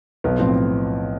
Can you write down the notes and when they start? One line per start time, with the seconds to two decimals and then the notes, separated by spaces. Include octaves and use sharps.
0.24 B1 B3
0.39 A2 F3 C4